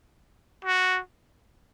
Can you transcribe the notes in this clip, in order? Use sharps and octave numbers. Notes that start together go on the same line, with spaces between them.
F#4